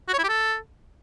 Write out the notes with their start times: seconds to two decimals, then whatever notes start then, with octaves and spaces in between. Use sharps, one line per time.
0.08 F#4
0.13 C#5
0.19 E4
0.24 G4
0.29 A4